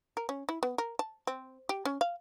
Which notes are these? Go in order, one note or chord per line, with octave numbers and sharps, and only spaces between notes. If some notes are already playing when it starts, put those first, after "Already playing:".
A#4
C#4
E4
B3
A#4
A5
C4
G4
C#4
F5